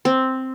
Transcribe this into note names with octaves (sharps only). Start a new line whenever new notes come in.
C4